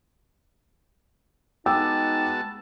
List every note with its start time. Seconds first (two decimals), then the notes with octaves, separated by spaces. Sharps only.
1.66 G#3 B3 D#4 F#4 G5 A5 D6 E6